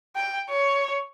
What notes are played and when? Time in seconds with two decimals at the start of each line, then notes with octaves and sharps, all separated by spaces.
0.16 G5
0.49 C#5